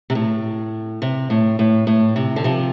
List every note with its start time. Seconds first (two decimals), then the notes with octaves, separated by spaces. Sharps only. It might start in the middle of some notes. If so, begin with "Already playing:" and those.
0.10 C3
0.15 A2
1.02 C3
1.30 A2
1.59 A2
1.87 A2
2.16 C3
2.36 D3
2.44 C3 F3